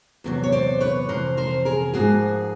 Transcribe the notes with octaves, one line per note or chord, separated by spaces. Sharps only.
E2 C3 D#3 F#3
C#5
C5 D5
B4 C#5
F2 C3 E3 A#4 C5
A#4 C5
G#4 A#4
G#2 F3 A#3 F#4 G#4